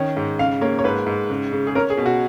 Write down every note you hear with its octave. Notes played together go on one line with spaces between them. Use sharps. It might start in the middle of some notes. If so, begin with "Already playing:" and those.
Already playing: D#3 C#4
G#2
C#3 F5
A#3 C#5
C#5
G#2 B4
G#2
C#3
C#3
G#4
C#4 A#4
G#4
B2
F#4